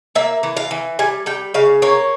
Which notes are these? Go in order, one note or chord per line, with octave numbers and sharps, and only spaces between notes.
A#3 E5
E3
F5
E3
G3 G#5
G3 G5
C#3 F5
A#3 C#5